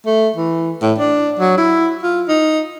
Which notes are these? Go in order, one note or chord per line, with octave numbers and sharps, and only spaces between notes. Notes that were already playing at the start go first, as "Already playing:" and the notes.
A3
E3
A2
D4
F#3
E4
F4
D#4